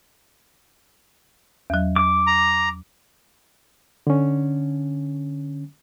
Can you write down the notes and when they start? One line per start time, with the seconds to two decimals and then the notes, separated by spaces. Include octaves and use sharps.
1.70 E2 F#3
1.96 D6
2.27 A#5
4.07 D3 C#4